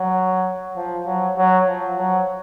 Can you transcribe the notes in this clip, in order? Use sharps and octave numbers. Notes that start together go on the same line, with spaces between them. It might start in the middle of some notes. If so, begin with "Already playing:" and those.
Already playing: F#3
F3
F#3
F#3
F3
F#3